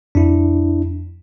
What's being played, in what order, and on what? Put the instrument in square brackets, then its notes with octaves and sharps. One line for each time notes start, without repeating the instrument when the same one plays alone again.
[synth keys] F2 [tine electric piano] D4 E4